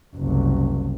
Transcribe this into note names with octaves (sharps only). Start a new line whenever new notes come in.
F#1 C2